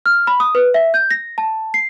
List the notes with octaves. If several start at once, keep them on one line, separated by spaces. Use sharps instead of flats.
F6
B5
D#6
B4
E5
G6
A#6
A5
C7